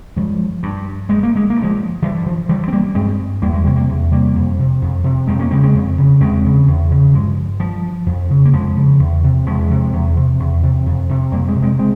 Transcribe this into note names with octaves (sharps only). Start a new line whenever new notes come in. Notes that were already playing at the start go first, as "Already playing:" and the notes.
G2 F3 G#3
G2
G2 G#3
A#3
G#3
A#3
G2
F3 G#3
G2 E3 G3
F3
G2 E3 G3
C4
G3 A#3
G2 G#3 C4
E2 G3 A#3
F3 G#3
C3 G3 A#3
G3 A#3
E2
C3 G3 A#3
F2
C3
F2
C3
F2 G#3 C4
A#3 C#4
C#3 G#3 C4
G#3 C4
F2
C#3
E2 G#3 C4
C#3
E2
C#3
G2 F3 G#3
G2 F3
F2
C#3
A#3
F2 F3 G#3
C#3
E2
C3
E2 F3 G#3
C3
E2
C3
E2
C3
F2
C3
F2 G3 A#3
G#3 C4
C3
G#3 C4
G#3 C4